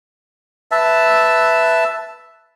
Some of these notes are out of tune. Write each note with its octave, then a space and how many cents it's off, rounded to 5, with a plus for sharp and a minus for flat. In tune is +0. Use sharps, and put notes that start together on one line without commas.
B4 +0 E5 +0 A5 +0